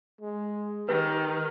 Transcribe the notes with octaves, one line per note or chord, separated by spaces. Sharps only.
G#3
D#3 G4 B4